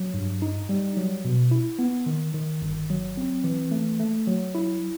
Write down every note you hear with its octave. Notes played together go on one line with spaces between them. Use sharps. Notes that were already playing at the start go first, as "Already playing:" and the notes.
Already playing: F#3
G2
D#4
G3
F#3
B2
E4
B3
D#3
D#3
G1
F#3
C4
E3
A3
A3
F#3
E4